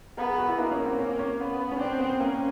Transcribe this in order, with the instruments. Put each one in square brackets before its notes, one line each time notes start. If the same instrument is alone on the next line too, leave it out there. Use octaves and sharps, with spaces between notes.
[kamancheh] B3 [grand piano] A#4
[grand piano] G#4
F#4
E4
[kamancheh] A#3 [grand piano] D#4
[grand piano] C#4
C4
C#4
C#4
[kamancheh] B3
[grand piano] C#4
[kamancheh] C4 [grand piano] D4
[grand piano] B3
[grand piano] A#3 [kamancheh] C#4